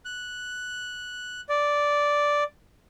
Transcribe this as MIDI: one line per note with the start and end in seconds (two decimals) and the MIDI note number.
0.05 1.41 90
1.49 2.44 74